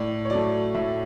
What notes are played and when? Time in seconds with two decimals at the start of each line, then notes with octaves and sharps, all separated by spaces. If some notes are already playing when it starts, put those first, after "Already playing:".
Already playing: A2 D5
0.25 C#5
0.30 F#3 A3 D5
0.75 A2 E5